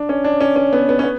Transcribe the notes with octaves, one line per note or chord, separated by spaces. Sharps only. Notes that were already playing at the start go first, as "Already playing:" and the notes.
Already playing: D4
C#4
D4
C#4
C#4
B3
B3
C#4
B3